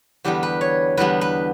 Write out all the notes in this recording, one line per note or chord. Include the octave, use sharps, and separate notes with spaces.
E2 D3 G3 B3 G4
B4
C#5
E2 D3 G3 B3 B4
B4